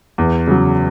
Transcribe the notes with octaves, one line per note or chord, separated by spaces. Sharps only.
E2
C#3 F#3